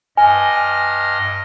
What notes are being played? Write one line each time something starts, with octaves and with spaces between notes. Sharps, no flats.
G2 D#5 G#5 F6